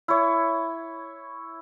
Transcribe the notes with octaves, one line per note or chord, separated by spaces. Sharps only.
E4 C#5